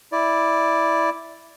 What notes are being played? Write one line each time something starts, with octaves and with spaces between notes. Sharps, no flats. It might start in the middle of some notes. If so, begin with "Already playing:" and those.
E4 D5